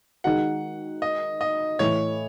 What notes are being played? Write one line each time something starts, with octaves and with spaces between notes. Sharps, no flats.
D#3 G#3 D#4 F#4 F#5
D#5
D#5
A2 E3 A3 C#5